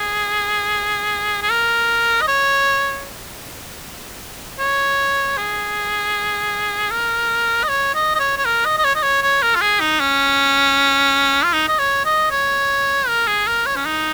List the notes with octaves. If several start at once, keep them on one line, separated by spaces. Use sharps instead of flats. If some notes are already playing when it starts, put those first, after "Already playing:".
Already playing: G#4
G#4
A#4
D#5
C#5
C#5
G#4
A#4
D#5
C#5
D#5
D#5
C#5
C#5
A#4
D#5
D#5
C#5
D#5
C#5
C#5
A#4
F4
G#4
D#4
C#4
F4
D#4
D#5
C#5
D#5
C#5
A#4
G#4
A#4
C#5
C#4
D#4